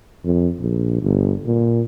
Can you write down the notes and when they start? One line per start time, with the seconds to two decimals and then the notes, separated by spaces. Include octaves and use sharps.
0.25 F2
0.59 A#1
1.02 G1
1.46 A#2